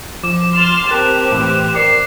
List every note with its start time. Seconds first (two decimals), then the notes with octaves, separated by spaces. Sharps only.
0.24 F3 D6 E7
0.55 C6 F6 A6 F7
0.91 C4 G4 A#4 A5 D6 F#6 E7
1.32 A2 E3
1.75 A#4 D5 D6 C7 C#7 E7